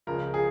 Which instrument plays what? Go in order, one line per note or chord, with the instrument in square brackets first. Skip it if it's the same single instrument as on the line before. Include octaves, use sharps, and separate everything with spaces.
[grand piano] C#2 C#3 F3 A#4
G#4